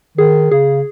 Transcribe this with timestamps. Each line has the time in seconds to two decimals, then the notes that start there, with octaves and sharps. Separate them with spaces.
0.18 D#3 G#4
0.51 C#3 G#4